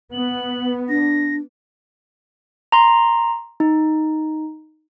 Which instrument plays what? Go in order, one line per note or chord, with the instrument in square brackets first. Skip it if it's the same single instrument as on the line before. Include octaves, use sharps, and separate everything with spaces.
[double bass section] B3 [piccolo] F#7
[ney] D4 [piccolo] A#6
[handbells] A#5 C6
D#4